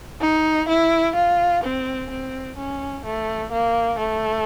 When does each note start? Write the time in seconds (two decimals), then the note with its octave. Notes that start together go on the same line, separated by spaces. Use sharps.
0.21 D#4
0.68 E4
1.15 F4
1.64 C4
2.10 C4
2.57 C#4
3.05 A3
3.52 A#3
3.98 A3